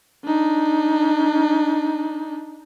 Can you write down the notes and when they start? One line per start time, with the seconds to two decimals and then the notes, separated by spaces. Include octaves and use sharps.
0.25 D4 D#4